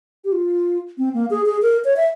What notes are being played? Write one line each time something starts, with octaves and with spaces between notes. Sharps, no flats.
G4
F4
C4
A#3
G#4
G#4
A#4
C#5
E5